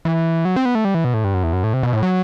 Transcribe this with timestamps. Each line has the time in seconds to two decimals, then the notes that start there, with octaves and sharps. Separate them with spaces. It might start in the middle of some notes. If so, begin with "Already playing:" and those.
0.05 E3
0.45 F#3
0.56 C4
0.65 B3
0.75 A3
0.85 G3
0.95 E3
1.05 B2
1.14 A2
1.24 G2
1.34 F#2
1.43 E2
1.53 F#2
1.64 A2
1.74 C3
1.83 B2
1.93 A2
2.03 F#3